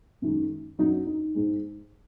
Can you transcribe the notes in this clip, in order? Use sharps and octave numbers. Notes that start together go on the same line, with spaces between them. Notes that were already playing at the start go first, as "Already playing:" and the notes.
F#2 D#3 G#3
F#2 F#3 D#4
D#4
G#2 G#3